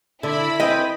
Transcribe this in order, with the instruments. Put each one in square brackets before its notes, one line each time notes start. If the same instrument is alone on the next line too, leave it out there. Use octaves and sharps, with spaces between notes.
[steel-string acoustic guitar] D3 [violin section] E4 B5 [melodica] E5
[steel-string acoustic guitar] C4 B4 [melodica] G#4 C5 G5 [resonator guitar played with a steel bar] D#5